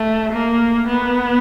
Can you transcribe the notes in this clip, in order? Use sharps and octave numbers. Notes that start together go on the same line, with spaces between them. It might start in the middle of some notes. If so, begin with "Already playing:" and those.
Already playing: A3
A#3
B3